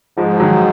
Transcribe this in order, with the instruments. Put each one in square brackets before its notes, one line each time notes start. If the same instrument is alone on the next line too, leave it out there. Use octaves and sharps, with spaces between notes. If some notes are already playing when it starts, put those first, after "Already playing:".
[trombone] G#2 [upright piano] F3 G#3
[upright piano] F3
D#3 F#3